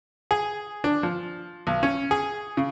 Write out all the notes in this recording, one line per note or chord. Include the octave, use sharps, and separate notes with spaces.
G#4
D4
F3
B1
C#4
G#4
C#3